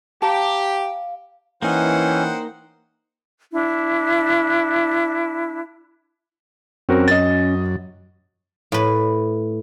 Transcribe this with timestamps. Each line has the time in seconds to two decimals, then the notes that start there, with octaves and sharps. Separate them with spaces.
0.22 G4 F5 A5 A#5
1.62 E3 A#3 C#4 D#4 C5 F#5 G5
3.52 D4 E4
6.89 F#2 C4 C#4 F#4 A#4
7.08 D#5 A6
8.72 A2 B4